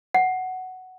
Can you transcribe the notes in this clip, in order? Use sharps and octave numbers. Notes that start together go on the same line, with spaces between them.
F#5